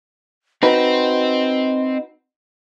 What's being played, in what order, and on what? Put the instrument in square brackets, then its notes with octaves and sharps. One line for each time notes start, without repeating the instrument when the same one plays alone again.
[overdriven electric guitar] C4 [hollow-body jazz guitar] D#4 F#4 B4 [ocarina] D#5